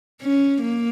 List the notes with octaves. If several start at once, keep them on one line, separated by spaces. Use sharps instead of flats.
C#4
A#3